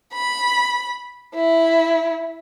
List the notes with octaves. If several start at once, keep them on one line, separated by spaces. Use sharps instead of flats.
B5
E4